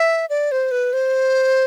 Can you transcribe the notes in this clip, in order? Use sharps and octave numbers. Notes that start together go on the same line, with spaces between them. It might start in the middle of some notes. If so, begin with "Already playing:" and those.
Already playing: E5
D5
C5
B4
C5